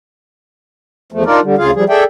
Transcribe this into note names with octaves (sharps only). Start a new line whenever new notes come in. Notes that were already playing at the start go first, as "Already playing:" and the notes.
E2 F3 A3
D4 D#4 F4 A#4 D5
D3 G3
D2 C#3 F4 G#4 F5
F3 G3 G#4
G#4 A4 D5 E5 G5